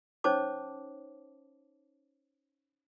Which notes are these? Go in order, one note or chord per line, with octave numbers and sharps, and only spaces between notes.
C#4 D#4 C5 C#5 A5 D6